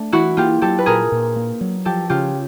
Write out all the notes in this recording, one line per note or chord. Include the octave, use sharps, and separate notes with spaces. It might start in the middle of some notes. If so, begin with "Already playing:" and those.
Already playing: A3 D4
E3 E4 F#4
A#3 F4 G4
F#3 G4 A4
B4
A#2 G#4 A#4
A#2
A#3
F#3
F3 G4 A4
C#3 F4 G4